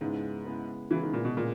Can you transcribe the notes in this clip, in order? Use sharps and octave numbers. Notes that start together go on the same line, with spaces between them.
G#2 C#3 G#3 B3 E4
C#3 G#3 B3 E4
C#3 E3 G#3 B3 E4
D#3
A#2
B2
A#2 C#3 G#3